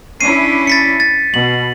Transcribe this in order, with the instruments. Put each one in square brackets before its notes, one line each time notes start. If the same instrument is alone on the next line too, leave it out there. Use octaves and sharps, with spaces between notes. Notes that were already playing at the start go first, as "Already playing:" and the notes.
[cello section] C#4 D4 E4 [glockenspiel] C7 D#7
[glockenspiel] A6 B6 C#7
A6
[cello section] B2 [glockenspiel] F#7